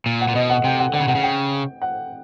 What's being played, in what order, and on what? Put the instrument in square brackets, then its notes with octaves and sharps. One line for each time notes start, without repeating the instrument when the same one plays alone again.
[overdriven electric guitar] A#2
[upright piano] F#5
[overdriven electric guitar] A#2
[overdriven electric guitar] B2 [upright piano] D#5
[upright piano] F#5
[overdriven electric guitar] C3 [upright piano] G5
[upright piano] F#5
[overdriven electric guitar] D3 [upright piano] F#5
[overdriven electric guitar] C#3
[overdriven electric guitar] C3 [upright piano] F#5
[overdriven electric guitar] C#3
[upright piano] G5
F#5